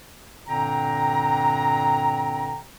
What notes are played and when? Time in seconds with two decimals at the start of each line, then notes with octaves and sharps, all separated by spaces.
0.47 G2 A#2 D3 C4 G5 A#5